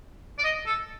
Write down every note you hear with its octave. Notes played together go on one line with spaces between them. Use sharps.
D5
D#5
A4